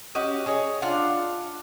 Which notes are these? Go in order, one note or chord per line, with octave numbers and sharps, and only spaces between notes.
C#4 F#4 G4 D#5
G#4 C#5 D#5
D4 F4 F5 F#5